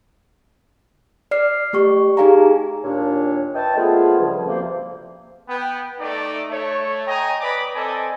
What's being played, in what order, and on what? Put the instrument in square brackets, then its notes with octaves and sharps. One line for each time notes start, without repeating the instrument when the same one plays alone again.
[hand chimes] D5 F6 C7
A3 G4 C#6
D#4 G4 G#4 F5 G#5 A#5
[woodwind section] D#2 A#2 D4 C#5
B4 C#5 D#5 E5 G5 A5
A#2 F3 A3 B3 F4 G#4
C#2 G2 C#3 F3
D2 C3 A#3 C5
[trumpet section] B3 G5
A3 D#4 D5
A3 C#5
D#5 G5 G#5 A#5
B4 D5 B5 D6 D#6
C4 A4 D5 D#5 G#5